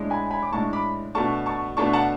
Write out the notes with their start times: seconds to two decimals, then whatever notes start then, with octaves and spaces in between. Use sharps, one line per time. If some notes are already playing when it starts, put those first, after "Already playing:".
Already playing: A2 G#3 D4
0.10 G#5 B5
0.31 G#5 B5
0.43 D6
0.52 A2 G#3 D4 A5 C#6
0.73 B5 D6
1.15 B2 A3 D4 A5 C#6
1.46 A5 C#6
1.77 B2 A3 D4 A5 C#6
1.93 F#5 A5